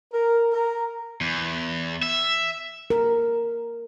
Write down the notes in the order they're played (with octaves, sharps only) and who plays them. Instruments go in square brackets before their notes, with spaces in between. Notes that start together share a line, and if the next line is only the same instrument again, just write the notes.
[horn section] A#4
A#4
[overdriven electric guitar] E2
E5
[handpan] A#4